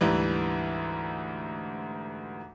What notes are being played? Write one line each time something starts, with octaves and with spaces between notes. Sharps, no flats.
D2 G#2 E3 G3